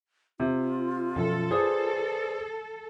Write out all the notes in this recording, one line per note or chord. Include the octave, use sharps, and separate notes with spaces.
C3 F4
F#2 B2 F3 A4
G#4 B4 C5 D5